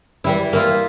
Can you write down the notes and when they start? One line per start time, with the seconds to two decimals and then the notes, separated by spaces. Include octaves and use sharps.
0.24 E3 G3 E4
0.53 A#3 E4 F4